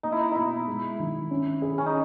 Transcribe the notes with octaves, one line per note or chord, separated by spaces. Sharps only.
A#3 D#4
E4
D#4
B2 D#4 E4
G#3
D#3
C#4
G#4
C#4
D#4